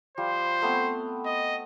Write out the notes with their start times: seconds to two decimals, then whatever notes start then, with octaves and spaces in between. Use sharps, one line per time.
0.18 F3 G3 C5
0.62 A3 B3 C4
1.26 D#5